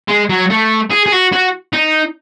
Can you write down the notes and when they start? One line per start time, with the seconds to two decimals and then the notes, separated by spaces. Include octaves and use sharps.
0.08 G#3
0.29 F#3
0.50 A3
0.90 G#4
1.06 G#4
1.12 F#4
1.32 F#4
1.73 D#4